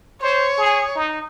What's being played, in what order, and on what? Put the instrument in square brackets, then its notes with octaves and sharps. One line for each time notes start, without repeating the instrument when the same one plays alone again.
[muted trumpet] C5 [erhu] C#5
[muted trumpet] G#4
D#4